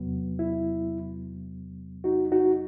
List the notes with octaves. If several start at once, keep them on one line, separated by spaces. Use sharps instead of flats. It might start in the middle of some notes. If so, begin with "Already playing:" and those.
Already playing: E2 C3 F#3 B3
E4
D#4 F#4
D#4 F#4